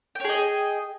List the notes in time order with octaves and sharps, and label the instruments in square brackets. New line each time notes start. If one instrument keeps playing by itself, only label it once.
[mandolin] G5
C#5
G#4
D#5